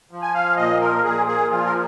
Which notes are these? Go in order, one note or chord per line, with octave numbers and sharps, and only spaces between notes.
F3
G#5
F5
A#2 D#5
A#4
A#2 G#4
G#4
F3 F4
A#4